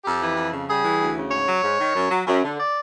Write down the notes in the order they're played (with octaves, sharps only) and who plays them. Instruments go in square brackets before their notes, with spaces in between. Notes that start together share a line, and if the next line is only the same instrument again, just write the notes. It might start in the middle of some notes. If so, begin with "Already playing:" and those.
[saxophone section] F2 G4
E3
F2
C#3
G3 G#4
E3
D2
C#3
G#2 C#5
F#3
G#2
D#3
F#2
F#3
F#2
D3
D5